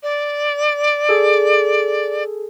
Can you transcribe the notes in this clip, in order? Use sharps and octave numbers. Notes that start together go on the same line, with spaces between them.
D5
G#4 A4